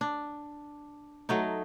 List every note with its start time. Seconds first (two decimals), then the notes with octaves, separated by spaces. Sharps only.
0.01 D4
1.29 F#3 A3 D#4